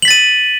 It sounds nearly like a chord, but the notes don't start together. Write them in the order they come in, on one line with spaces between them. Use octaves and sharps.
F#7 B6 A6 D#7